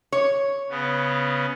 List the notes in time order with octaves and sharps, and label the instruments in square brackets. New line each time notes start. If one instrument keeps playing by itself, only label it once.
[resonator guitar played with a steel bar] C#5
[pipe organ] C#3 B3